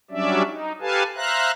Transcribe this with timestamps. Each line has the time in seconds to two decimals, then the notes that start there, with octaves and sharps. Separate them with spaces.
0.11 F#3 G3 C#4 D4 D5 E5
0.46 D#4
0.81 G4 A4 B4 F5 G#5 A5
1.16 C5 E5 F5 A#5 F#6